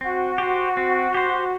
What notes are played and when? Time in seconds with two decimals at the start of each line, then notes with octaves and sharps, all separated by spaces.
0.01 C4 F#4
0.38 G4 C5
0.77 C4
1.14 G4 C5